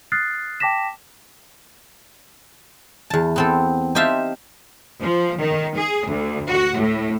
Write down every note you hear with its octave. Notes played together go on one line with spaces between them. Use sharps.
D#6 F6 F#6 A6 C7
G5 A5 D6 A#6 B6 E7
E2 A5
B3 C4 A4
D#4 G4 C5 E5 F5 A5
F3
D#3
G#4
D2
F#4
A2